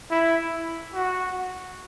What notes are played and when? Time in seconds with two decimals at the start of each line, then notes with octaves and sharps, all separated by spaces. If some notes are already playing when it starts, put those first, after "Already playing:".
0.11 E4
0.94 F#4